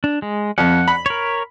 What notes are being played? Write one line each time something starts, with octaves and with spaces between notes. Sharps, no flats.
D4
G#3
F2 F#5
B5
A#4 C#5